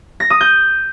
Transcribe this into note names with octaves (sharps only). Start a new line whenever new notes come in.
A#6
D#6
G6